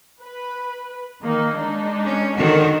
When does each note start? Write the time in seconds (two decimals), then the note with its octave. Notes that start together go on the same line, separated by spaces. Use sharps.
0.22 B4
1.21 D#3 A#3 D#4
1.56 G#3 D4 D#4
2.07 C#4
2.37 D3 D#3 F#4